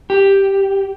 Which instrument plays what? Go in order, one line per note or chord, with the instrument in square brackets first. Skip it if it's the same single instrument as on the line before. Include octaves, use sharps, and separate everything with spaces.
[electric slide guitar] G4